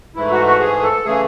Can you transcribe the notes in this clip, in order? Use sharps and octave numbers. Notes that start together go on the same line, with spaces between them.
G#2 E3 A3 E4
F#4
F#4
G#4
A4
C#3 E3 A3 G#4